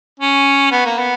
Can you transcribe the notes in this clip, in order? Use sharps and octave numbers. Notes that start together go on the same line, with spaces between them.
C#4
B3
A#3
B3